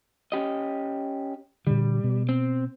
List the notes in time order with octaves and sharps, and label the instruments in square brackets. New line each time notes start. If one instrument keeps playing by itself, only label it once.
[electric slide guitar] C#4 G4 D#5
[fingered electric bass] A#2 D3 [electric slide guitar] G3
[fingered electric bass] B2
[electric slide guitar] C4